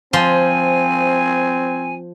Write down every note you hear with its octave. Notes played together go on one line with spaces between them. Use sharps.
F3 C4 G#5 C6